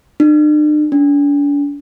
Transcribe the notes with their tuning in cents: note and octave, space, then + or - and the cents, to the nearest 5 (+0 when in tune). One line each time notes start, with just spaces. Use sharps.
D4 +45
D4 -40